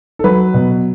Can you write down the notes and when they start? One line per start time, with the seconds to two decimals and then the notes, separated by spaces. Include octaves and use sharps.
0.19 A4
0.24 F#3 B4
0.54 B2